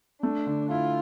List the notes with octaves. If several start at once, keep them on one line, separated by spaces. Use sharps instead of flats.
A3 D4
D3
E4 F4